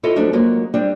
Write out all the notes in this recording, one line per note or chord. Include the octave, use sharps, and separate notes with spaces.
E4 F4 A4 C#5 D#5 E5
F3 F#3 A3 D4
F3 F#3 G#3 A#3
G3 C4 D4